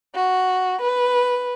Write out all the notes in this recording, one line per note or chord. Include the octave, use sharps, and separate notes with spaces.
F#4
B4